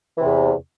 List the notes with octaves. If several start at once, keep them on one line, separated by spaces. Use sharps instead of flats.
E2 C3 E3